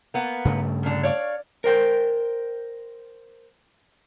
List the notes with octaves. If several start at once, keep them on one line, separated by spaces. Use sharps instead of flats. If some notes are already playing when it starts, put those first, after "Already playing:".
A#3 B3
G2 C#3 A3
A#2 D3
C#5 D5 F5
A#4 C5 G5